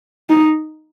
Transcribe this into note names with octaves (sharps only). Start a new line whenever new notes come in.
D#4